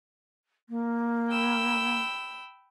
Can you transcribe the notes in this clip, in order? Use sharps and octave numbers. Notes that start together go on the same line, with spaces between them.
A#3
G5 B5 E6